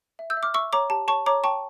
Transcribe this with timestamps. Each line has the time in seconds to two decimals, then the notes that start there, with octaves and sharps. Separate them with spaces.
0.19 E5
0.30 E6 G6
0.37 E5
0.43 D6 F6
0.54 E5 C#6 E6
0.73 C#5 A#5 D6
0.90 G4 A5
1.08 C#5 A5 C#6
1.26 C#5 A#5 D6
1.44 G5 A5 C#6